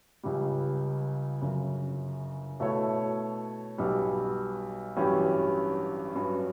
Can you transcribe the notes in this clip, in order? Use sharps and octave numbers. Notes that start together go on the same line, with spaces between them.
C#2 C#3 G3
G1 F#2 C#3
B2 A3 E4 A4 C#5
B1 B2 G3
A1 G2 F#3 C#4 G4
G2 F#3 C#4 F#4 B4